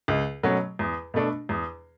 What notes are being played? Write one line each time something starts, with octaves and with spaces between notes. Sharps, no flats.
C#2
B2 F#3 A3 C#4
E2
B2 A3 D4
E2